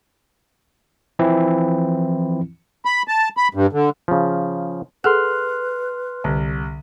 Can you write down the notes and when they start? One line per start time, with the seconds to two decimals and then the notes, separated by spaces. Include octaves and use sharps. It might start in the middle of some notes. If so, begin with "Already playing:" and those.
1.19 E3 F3 C4 E4
2.85 B5
3.08 A5
3.37 B5
3.54 G2
3.73 D3
4.08 C#3 F3
5.04 G#4 A4 B4 F#5 C6 F6 F#6
6.24 C2 D3